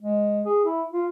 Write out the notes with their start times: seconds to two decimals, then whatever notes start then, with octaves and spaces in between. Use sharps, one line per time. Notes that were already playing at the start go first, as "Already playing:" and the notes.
0.01 G#3
0.45 G#4
0.65 E4
0.93 F4